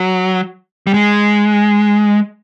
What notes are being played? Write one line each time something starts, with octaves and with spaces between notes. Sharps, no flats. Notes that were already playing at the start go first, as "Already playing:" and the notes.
Already playing: F#3
G3
G#3